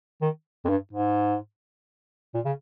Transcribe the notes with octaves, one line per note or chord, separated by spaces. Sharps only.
D#3
F2
G2
G#2
A#2
C#3